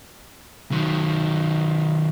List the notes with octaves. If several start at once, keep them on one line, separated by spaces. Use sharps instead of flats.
D#3 F#3